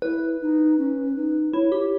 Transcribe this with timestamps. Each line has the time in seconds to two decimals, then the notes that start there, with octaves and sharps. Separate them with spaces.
0.02 E4 B4
0.41 D#4
0.78 C#4
1.16 D#4
1.53 E4 C#5
1.72 G4